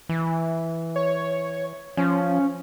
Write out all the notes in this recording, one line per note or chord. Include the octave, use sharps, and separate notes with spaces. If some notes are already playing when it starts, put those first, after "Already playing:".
E3
C#5
F3 C#4